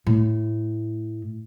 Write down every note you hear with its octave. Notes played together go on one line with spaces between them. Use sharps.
A2